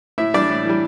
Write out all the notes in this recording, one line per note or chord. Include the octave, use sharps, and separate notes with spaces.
A2 E4 E5
E3 G3 D4 D5
A2
E3 G3